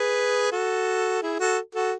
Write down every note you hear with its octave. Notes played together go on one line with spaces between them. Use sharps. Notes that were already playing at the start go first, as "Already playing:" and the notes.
Already playing: G#4 B4
F#4 A4
E4 G#4
F#4 A4
F#4 A4